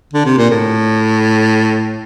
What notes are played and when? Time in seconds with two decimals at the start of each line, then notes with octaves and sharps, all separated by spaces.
0.13 D3
0.26 C3
0.38 A#2
0.50 A2